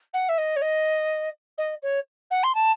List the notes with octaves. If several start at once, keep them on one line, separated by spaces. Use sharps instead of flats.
F#5
E5
D#5
C#5
D#5
D#5
C#5
F#5
C6
A5